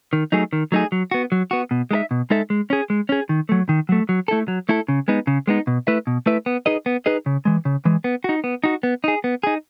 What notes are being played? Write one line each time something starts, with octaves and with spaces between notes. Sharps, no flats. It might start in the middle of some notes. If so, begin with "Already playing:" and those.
D#3
F#3 A3 D#4 G#4
D#3
F#3 A3 D#4 G#4
F#3
B3 F#4
F#3
B3 F#4
B2
G#3 D#4 A4 E5
B2
G#3 D#4 A4 E5
G#3
C#4 G#4
G#3
C#4 G#4
D#3
F#3 A3
D#3
F#3 A3
F#3
A3 E4 A4
F#3
A3 E4 A4
C#3
G#3 B3 D#4
C#3
G#3 B3 D#4
B2
A3 E4 B4 E5
B2
A3 E4 B4 E5
B3
D#4 G#4 B4 D#5
B3
D#4 G#4 B4 D#5
C#3
E3 G#3
C#3
E3 G#3
B3
D#4 F#4
B3
D#4 F#4
B3
D#4 G#4
B3
D#4 G#4